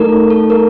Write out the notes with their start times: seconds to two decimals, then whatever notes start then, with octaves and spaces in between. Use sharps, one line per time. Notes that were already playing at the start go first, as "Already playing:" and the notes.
Already playing: A3 D#4 A4 A#4
0.30 A4
0.50 A#4